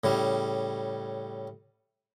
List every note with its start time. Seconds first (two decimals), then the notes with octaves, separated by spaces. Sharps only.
0.04 A2 C#3 G3